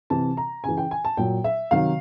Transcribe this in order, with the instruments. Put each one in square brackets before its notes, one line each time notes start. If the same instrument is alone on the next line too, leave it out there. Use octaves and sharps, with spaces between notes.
[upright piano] C3 E3 A5
A#5
C#3 E3 G#5
G5
G#5
A5
A#2 F#3 G5
E5
C3 D#3 F#3 F5